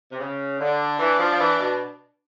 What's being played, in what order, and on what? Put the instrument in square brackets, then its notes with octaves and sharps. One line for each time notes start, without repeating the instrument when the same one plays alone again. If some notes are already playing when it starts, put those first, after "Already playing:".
[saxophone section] C3
C#3
[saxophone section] D3 [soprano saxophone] D4
[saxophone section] E3
F3
F3
E3
B2